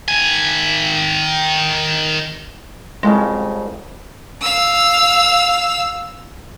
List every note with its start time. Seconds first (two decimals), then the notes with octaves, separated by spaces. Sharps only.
0.08 D#3 G#5
3.03 C2 F2 C#3 G#3
4.42 F5 E6